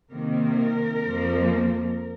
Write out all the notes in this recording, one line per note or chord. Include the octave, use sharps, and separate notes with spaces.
C3 D#3 A#3 A#4
F2 F3 A#3